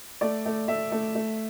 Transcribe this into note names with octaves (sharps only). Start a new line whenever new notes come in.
A3 D5
A3
A3 E5
A3
A3